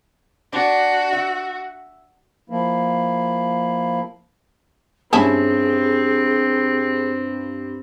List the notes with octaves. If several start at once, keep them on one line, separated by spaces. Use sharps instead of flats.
D4 F#4
E5
F3 A#3 E4
G2 C4 C#4 E4 G#4 A5